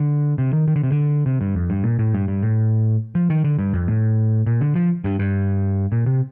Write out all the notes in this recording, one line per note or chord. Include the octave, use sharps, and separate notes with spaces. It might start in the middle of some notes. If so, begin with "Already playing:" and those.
Already playing: D3
C3
D#3
D#3
D3
C3
D3
C3
G2
F2
G2
A#2
A2
G2
G2
A2
F3
D#3
D3
G2
F2
A2
A#2
D3
F3
G2
G2
A#2
C3